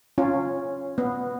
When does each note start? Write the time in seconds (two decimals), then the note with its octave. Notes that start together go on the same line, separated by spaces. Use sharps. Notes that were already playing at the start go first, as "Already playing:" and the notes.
0.18 C#4 F4
0.98 B3